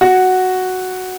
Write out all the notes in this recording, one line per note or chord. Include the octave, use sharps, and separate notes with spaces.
F#4